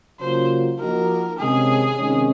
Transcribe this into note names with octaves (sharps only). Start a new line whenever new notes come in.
C#3 F#3 A#3 F4 C5
F3 A#3 D#4 F#4 A#4
C3 D#3 G#3 C#4 G#4
C3 D#3 G#3 C#4